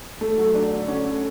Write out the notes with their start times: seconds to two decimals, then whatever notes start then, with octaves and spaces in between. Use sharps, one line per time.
0.21 A3
0.38 F#3
0.54 D4
0.72 D3
0.88 C#4
1.04 A3